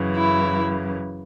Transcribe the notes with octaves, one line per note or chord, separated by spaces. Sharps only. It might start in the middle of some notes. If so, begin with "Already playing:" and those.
Already playing: F#2 C#3 E3
E4